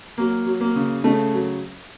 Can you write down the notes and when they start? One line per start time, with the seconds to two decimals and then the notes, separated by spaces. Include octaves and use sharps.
0.18 F#3 A#3
0.46 F#3
0.61 A#3
0.76 C#3
1.04 C#3 A3
1.33 F#3